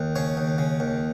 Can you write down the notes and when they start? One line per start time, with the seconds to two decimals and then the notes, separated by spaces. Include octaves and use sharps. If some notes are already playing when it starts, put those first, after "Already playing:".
Already playing: D#2
0.16 C#3 C#5
0.37 D#2
0.58 C#3
0.80 D#2